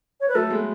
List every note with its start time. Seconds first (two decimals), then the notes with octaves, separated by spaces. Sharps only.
0.20 C#5
0.28 B4
0.35 F#3 A3 A4
0.50 G#3 B3